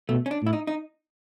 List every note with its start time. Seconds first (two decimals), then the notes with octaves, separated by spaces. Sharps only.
0.09 B2 A3
0.26 C#4
0.31 D4
0.42 A2 E4
0.53 D#4
0.67 D#4